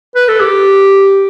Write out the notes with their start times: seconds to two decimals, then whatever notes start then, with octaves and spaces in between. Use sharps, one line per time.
0.15 B4
0.28 A4
0.41 G4